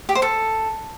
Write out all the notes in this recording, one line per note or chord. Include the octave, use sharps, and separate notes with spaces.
G4
C5
A4